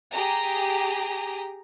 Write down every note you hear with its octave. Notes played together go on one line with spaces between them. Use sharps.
G4 G#4 A#5